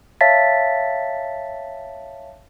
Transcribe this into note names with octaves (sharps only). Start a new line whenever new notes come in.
C#5 E5 F5 A5 A6 B6